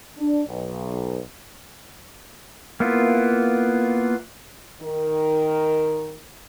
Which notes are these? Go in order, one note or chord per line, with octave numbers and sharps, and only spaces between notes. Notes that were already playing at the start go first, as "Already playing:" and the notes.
D4
B1
A#3 B3 E4 F4
D#3 A#4